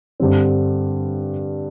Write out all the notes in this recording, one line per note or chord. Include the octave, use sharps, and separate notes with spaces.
G2 D3 G3 C4